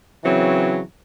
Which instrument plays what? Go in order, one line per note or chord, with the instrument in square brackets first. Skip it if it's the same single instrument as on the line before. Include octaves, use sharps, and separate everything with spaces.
[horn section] C#3 E3 F#3 C4